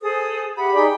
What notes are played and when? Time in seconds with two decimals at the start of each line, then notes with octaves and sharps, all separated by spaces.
0.01 G#4 A4 C5 D#6
0.57 G4 E5 F#5 B5
0.74 D#4 G#4 D5 G5